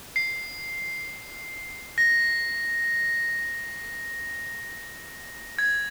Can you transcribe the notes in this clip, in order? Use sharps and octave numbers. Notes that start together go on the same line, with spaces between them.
C7
A#6
G#6